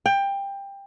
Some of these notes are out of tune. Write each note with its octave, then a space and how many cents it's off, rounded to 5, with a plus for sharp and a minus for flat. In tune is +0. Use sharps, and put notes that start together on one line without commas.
G5 +20